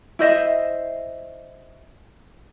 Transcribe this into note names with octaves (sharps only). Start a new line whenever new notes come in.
E4 C5 D#5 E5